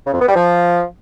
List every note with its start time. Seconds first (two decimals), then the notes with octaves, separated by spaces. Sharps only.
0.06 C#3
0.13 F2
0.21 B3
0.28 G3
0.35 F3